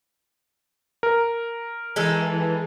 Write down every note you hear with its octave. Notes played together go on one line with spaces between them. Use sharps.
A#4
E3 G#3 D#4 A4